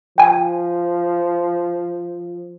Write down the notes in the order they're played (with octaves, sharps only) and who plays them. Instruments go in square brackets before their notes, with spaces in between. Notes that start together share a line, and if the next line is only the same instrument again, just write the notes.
[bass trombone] F3 [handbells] G5 G#5